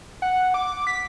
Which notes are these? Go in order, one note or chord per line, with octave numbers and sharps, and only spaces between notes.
F#5
D6
B6